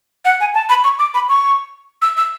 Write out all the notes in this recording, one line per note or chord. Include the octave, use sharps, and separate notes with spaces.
F#5
G#5
A5
B5
C#6
D6
B5
C#6
E6
E6